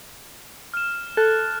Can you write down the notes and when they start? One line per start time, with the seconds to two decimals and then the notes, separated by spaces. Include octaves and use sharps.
0.74 F6 E7
1.17 A4 F#6 G#6 A6